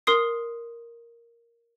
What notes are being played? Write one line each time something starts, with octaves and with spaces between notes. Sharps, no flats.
A#4 C6 D#6 C7